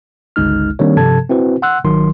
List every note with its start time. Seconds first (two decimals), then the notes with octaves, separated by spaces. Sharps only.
0.36 G1 C#2 G#3 D#4 F6
0.79 D#3 G3 A#3 C4 D4 C#5
0.97 G2 C3 F3 A4 A5 G#6
1.30 C4 E4 F#4 B4 C5
1.62 F#5 C6 E6 F#6
1.84 G#1 D#3 F#3 C6